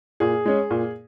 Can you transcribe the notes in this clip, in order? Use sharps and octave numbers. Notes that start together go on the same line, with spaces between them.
A#2 G#4
G#3 C#4
A#2